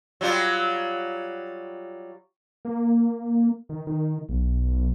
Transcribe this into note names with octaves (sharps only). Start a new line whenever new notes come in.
F#3 G3 F4
A#3
D#3
D#3
B1